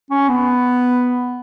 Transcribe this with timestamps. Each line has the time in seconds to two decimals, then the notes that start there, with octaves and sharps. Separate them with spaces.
0.11 C#4
0.29 B3